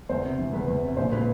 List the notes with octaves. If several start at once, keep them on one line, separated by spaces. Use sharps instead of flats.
E2 C5
C3
E3
E2 B4
E2
C3
A#1 C5
A#2 B4